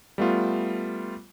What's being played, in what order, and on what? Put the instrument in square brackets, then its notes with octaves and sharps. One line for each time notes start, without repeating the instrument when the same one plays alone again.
[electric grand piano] G3 A3 B3 F4